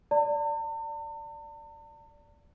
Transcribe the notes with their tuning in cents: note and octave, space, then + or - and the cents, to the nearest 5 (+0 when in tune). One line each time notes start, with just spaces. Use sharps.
D5 -10 A5 +45